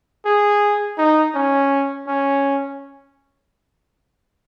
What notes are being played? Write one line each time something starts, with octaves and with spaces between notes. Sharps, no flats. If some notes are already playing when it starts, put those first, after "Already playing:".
G#4
D#4
C#4
C#4